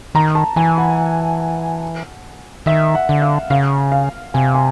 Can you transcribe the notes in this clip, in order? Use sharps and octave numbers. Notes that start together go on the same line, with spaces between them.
D#3 A#5
A5
E3 G#5
F#5
D#3 E5
F#5
D3
F5
C#3 F5
F5
C3 G#5
G#5